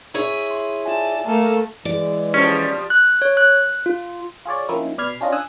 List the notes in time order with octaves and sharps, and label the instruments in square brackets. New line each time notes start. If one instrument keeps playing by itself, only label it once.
[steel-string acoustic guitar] E4 G#4 C#5
[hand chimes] C6
[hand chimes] F4 E5 G#5 [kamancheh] D5 A5
[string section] A3 [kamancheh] A#3 A4 [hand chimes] A5
[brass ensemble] E3 G#3 [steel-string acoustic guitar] D5
[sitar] F3 G3 [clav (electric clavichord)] C#4
[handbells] F#6
C#5
F#6
F4
[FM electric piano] F4 G#4 C#5 D5
F3 A#3 C4 C#4 D#4 E4
B2 D5 B5 F6 G#6 C7
C#4 D4 F4 D#5
G#5 D#6 E6 F#6